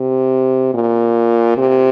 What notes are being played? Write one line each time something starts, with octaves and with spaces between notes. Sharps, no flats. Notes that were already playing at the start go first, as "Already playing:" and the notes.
Already playing: C3
A#2
C3